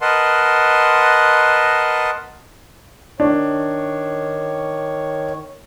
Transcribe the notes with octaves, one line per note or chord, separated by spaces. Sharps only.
A#4 B4 D#5 F#5 A5 C6
D#3 D4 C#5